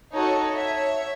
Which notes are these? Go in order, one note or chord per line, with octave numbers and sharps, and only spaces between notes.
D#4 F#4 A4 C#5
C#5 E5